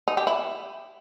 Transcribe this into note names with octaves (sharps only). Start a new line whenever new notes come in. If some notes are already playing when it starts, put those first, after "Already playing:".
D#4
G4
E4